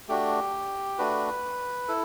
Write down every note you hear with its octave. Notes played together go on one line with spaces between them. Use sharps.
A3 D4 F#4 G4
A3 D4 F#4 B4
E4 A4